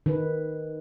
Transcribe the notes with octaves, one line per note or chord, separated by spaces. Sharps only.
D#3 D#4 B4